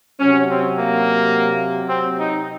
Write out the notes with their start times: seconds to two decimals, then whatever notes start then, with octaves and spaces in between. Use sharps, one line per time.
0.20 C3 F#3 C#4
0.49 C4
0.76 A#3
1.88 C4
2.18 D#4